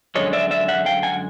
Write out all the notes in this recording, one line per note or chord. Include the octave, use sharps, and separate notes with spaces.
F#2 D3 F3 G#3 C#5 D#5
D5 E5
D5 E5
E5 F#5
F5 G5
F#5 G#5